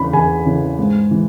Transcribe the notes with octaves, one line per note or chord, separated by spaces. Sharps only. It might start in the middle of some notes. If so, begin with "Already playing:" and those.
Already playing: E2 C#3 E3 B5
E2 G#5
C#3 E3
G#2
E3